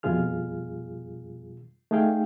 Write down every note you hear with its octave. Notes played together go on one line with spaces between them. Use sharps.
F2 B2 G3 F4 G#4 F6
A3 D#4 G#4 F5 G5